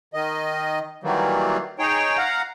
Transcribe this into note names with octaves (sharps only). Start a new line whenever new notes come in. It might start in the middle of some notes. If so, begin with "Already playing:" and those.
D#3 D#5
D#3 E3 F#3 G3 A#3
D#4 G#4 C#5 G5
F5 F#5 A#5